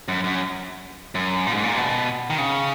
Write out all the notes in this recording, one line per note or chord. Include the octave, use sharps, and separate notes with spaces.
F#2
F#2
F#2
A#2
G#2
A#2
B2
D#3
C#3